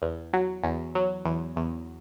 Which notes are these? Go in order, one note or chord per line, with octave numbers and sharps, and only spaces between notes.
E2
F#3
E2
F#3
E2
E2